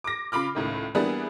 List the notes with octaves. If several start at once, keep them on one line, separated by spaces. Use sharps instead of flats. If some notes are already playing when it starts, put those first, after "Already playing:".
D6 A#6
C#3 F4 B5 D6 F6
C#2 A2 D#3
E3 G3 A#3 B3 D4 G#4